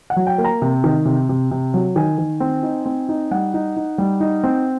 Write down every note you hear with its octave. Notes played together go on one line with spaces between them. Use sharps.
F#5
F#3
G5
A#3
A#5
C3
D#3
C3
C3
C3
F#3
D#3 G#5
D#3
C4
D#4
C4
D#4
G3 F#5
D#4
D#4
G3
D#4
C4